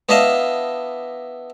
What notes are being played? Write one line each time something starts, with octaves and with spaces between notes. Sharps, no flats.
B3 D4 E4 D#5 F5 A5